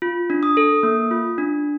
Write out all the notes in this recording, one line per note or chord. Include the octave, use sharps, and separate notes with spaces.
F4
D4
D#6
A4
A#3
F4
D4